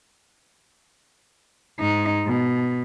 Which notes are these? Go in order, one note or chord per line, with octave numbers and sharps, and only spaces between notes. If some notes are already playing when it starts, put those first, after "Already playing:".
G#2 D#4
B2